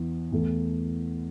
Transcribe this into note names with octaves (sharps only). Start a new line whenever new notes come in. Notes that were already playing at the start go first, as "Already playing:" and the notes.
Already playing: E2 E3
E2 E3 A3 E4 A4